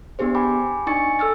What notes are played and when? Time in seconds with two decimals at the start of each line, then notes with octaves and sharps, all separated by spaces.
0.19 B3 D4 G4 G#4 C5
0.35 G5 G#5 B5 D6
0.87 D4 D#4 G#5 C#6 A6 C#7
1.19 A4 E6 F6 A6